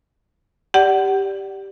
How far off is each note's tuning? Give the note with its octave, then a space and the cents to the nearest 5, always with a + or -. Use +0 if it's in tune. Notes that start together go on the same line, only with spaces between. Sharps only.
G4 +0 D5 +0 F#5 +25